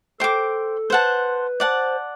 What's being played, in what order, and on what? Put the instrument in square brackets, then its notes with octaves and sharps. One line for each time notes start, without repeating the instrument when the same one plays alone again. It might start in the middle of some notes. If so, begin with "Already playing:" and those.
[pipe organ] A4 [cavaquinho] C5 G5 D6
[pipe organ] B4 [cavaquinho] C5 F#5 A5
[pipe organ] C5 [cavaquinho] D5 F#5 A5